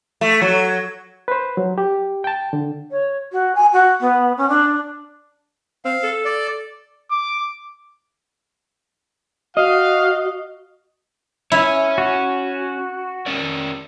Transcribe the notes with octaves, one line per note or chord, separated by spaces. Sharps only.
A3
F#3
B4 C5
F#3
G4
G5 A5
D3
C#5
F#4
G#5
F#4
B3
C#4
D4
C4 F5
A4
D5
D6
F#4 D#5 F5
C#4 E4 C#5
F#4
C#4 A#4 D5